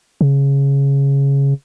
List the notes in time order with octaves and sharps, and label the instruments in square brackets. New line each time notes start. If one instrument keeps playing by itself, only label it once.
[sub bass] C#3